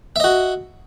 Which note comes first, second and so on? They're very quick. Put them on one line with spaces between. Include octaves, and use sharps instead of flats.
E5 D#5 F#4